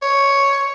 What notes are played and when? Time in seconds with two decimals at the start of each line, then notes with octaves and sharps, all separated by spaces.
0.02 C#5